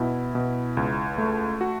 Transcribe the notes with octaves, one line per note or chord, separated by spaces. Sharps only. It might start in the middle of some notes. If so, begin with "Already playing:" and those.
Already playing: B2 E4
B2
C#2
A3
F#4